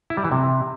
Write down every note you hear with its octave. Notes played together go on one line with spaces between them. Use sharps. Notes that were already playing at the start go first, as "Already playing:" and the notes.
E4
G3
E3
C3